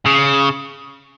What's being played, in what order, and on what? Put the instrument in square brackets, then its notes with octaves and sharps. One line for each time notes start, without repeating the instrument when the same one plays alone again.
[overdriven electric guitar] C#3